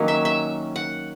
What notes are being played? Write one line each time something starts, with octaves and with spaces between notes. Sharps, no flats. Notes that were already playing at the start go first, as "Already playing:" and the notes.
Already playing: D#3 F#3 A#3 C#4
E5
E5
F#5